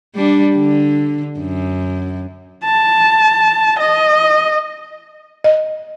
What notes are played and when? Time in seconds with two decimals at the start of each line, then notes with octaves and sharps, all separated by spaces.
0.15 G3 D4
0.56 D3
1.39 F#2
2.64 A5
3.79 D#5
5.44 D#5